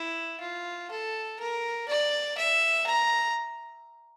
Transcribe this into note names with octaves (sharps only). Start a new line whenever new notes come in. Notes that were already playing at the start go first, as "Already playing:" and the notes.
Already playing: E4
F4
A4
A#4
D5
E5
A#5